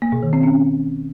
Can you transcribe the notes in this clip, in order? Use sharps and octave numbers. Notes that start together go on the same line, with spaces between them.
A#3
B2
D#3
C4
C#4